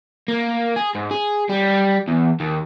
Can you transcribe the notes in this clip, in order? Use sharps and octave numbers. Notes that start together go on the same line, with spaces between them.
A#3
G#4
G#2
G#4
G3
E2
D#2